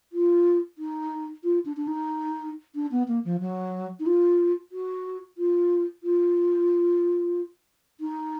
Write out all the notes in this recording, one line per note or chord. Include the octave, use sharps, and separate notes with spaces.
F4
D#4
F4
D4
D4
D#4
D4
B3
A#3
F3
F#3
D#4
F4
F#4
F4
F4
D#4